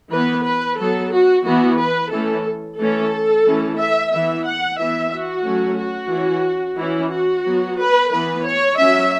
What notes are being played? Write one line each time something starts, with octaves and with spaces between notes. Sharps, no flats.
E3 B3 B4
B4
F#3 B3 A4
F#4
E3 B3 F#4
B4
E3 A3 C#4 A4
E3 A3 C#4 A4
E3 A3 C#4
E5
E3 B3 E5
F#5
E3 B3 E5
F#4
F#3 A3 C#4
F#4
E3 C#4
E3 C#4 E4
F#4
F#3 B3
B4
E3 B3 B4
C#5
F#3 C#4 E5